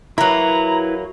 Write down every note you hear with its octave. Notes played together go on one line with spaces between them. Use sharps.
F#3 A#3 E4 B4 A#5